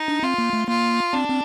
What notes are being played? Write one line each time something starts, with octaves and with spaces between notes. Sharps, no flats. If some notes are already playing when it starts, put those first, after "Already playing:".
Already playing: D#4
D4
C4 F4
A#3
A3
A#3 F4
C4 D4
C4